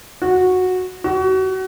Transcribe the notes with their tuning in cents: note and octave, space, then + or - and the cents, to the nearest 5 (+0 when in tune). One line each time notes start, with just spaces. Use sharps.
F#4 -10
F#4 +30